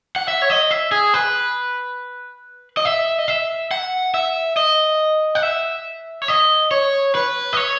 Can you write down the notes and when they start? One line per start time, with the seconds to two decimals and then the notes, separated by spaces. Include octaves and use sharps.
0.16 F#5
0.28 E5
0.42 C#5
0.50 D#5
0.71 E5
0.92 G#4
1.14 B4
2.77 D#5
2.85 E5
3.19 D#5
3.28 E5
3.71 F#5
4.14 E5
4.57 D#5
5.35 F#5
5.43 E5
6.22 C#5
6.28 D#5
6.71 C#5
7.15 B4
7.53 D#5
7.57 C#5